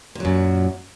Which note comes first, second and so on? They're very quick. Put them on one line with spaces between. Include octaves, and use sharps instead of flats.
A#2 F#3 F#2